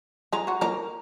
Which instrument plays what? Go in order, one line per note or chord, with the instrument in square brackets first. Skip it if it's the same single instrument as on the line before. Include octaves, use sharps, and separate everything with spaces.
[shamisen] G#3 G#4 [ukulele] A#5
[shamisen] F#3 F#4
[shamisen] A#3 A#4 [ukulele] A#5